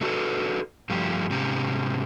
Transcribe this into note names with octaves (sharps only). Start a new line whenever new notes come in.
A3 D4 F#4 G4 A4 B4
G2 F3 A3 F4 G4
G#2 C3 C#4 G4 A#5